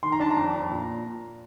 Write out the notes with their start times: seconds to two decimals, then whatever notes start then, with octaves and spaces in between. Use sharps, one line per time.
0.03 D#3 C6
0.12 A#5
0.20 D4 A5
0.30 A#5
0.37 F2
0.54 F2
0.71 A#2